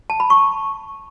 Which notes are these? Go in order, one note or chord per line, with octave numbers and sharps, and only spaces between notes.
A5
B5
C#6